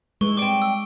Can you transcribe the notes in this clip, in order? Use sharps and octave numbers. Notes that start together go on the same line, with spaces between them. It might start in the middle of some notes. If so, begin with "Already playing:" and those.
E3 G#3 C#6 G7
G3 C4 D6 D7
E6